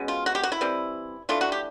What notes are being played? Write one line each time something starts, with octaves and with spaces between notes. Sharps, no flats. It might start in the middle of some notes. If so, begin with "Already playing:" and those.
Already playing: B2 G#3 C#4
F4
F#4
G4
F#4
E4
E3 G3 C4
E3 A3 D4 F4
F#4
G4